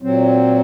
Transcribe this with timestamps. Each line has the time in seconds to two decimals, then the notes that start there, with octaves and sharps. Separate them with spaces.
0.02 A#2 F#3 C4